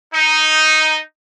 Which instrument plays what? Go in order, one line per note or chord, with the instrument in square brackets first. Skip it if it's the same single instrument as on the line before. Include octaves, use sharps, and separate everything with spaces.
[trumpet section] D#4